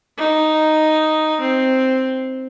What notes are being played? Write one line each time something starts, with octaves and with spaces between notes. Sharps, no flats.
D#4
C4